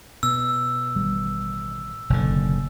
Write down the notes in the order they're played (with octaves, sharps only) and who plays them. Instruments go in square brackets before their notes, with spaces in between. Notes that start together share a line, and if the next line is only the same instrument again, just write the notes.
[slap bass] B2 [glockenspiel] E6
[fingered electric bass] A1 D#3 G3
[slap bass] F#1 D3 [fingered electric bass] B2